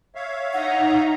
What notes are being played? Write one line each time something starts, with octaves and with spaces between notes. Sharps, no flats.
C#5 E5 F5
D#4 F#5 A#5